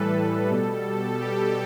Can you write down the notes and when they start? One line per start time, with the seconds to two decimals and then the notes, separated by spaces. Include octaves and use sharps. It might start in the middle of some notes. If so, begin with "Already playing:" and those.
Already playing: A2 E3 G3 A4 B4
0.50 B2 G3
1.21 G4